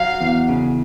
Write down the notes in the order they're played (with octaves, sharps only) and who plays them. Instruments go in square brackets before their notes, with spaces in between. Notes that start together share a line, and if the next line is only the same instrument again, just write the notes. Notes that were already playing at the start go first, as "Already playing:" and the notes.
Already playing: [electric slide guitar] F#3 [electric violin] F5
[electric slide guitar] E2
C#3